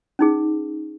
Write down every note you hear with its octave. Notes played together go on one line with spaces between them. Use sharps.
C#4 D#4 G#4